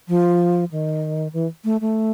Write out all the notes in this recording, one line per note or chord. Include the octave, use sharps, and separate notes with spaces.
F3
D#3
E3
A3
A3